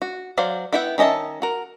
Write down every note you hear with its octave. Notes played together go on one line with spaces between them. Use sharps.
F#4
F#3 C5 D5 F5
B3 E4 E5 F#5 G5
D#3 C#4 D#5 E5 A5
F#4 A#4